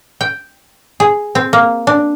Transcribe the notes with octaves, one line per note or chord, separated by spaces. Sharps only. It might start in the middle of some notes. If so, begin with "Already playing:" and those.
G5
G#4
C4
A#3
D4